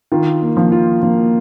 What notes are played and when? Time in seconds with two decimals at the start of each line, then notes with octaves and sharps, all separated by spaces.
0.12 D#3 F4
0.42 A#3
0.57 F3
0.72 F4
1.02 F3 A#3